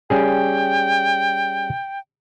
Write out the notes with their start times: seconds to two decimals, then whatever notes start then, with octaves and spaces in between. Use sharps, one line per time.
0.10 G3 C#4 G#4 G5